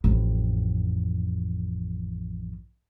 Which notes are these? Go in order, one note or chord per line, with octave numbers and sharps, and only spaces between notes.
A1 F2